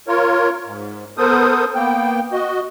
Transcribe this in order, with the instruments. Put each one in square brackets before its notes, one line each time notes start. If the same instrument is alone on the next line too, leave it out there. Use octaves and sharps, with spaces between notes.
[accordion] F4 A#4 C#5
G#2
B3 A4 A#4 C5 D#6
A#3 B3 G5
F#4 D#5